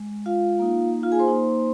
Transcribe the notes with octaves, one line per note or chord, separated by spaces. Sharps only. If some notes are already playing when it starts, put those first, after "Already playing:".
Already playing: G#3
F4 F5
A#3 D#4
F4 F5
G#4 G#5
C5 C6
A#3 D#4